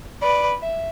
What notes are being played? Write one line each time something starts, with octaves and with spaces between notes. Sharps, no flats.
B4 D5
E5